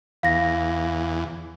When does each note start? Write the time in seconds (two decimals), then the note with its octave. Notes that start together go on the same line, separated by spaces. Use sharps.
0.23 E2 F5 A#6